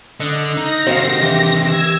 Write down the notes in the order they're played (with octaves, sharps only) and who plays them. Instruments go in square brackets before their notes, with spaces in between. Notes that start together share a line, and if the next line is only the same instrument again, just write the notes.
[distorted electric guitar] D3 [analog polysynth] D#5 F#6
[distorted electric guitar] D#4 [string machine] A#6
[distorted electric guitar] C3 D#3 [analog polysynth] F#4 [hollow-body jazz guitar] C5 D#5 F5
[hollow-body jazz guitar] E3 [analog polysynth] G4
[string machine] E6 G#6